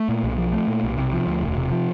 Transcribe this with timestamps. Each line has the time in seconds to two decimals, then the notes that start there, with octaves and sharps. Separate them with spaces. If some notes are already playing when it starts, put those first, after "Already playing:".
Already playing: A3
0.09 A#2
0.23 B1
0.38 F3
0.53 A3
0.68 A#2
0.83 B1
0.97 C3
1.13 F3
1.27 D2
1.42 E1
1.58 C3
1.71 F3